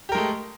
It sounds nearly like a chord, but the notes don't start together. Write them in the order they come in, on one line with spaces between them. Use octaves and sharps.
G4 A#4 G#3 A3